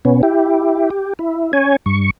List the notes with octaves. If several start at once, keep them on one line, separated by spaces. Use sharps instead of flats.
B2 B3 C#4
E4 G4
G4
E4
C#4 C#5 G#5
G2 C#6